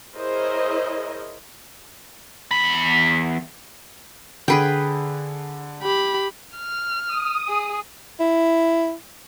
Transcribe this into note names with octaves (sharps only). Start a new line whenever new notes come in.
E4 G#4 A#4 C5 C#5 D#5
E2 B5
D3 G#4 B4 G5
G4 B5
F6
D#6
G#4
E4